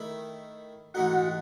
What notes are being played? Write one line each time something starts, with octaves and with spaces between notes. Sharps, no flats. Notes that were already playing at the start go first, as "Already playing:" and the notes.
Already playing: D#3 A3 E4
G#2 E3 A3 D#4 F#4 F#5